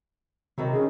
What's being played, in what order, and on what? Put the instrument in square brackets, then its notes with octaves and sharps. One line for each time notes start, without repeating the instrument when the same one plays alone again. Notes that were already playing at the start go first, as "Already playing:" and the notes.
[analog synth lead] C3 [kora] D#3 F#3 E4
[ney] C#4 [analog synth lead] G#4